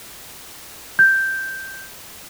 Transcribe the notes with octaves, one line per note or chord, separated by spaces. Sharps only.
G6